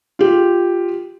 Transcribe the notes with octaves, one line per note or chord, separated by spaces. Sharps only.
F4 G4